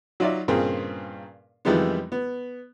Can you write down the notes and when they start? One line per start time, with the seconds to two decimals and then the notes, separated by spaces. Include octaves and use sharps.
0.20 F#3 D#4 F4 D5 E5
0.48 G2 A#2 C#3 C4 G#4 A#4
1.65 F2 D#3 E3 G3 G#3 B3
2.12 B3